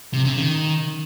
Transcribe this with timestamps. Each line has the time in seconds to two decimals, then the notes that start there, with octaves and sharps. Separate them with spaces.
0.14 C3
0.25 C#3
0.36 D#3